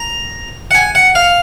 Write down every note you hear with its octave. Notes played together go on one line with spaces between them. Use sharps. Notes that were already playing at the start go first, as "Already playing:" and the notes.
Already playing: A#5
F#5
G#5
F#5
F5